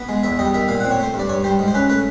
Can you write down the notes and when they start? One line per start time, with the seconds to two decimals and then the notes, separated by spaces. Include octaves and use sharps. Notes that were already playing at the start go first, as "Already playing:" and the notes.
Already playing: B3
0.09 G#3
0.23 E2 E5
0.39 G3 D#5
0.54 D#3 E5
0.68 A#2 F5
0.80 F#5
0.84 C4
0.91 C#5
0.99 A3 C5
1.14 G2
1.19 D5
1.29 G2 C#5
1.44 G3 C5
1.59 G#2
1.68 C5
1.74 C#4 B4
1.89 A3 B4